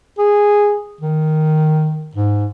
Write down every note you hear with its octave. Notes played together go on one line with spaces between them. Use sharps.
G#4
D#3
G#2